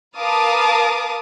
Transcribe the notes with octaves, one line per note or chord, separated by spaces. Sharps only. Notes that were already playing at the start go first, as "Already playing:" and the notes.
A#4 B4 F5 A5 D6 D#6